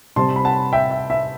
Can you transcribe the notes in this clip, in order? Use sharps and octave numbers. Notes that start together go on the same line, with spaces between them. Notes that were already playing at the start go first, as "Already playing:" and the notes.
C3 G3 C4 A5 C6
B5
F#5 A5
E5 G5
E5
E5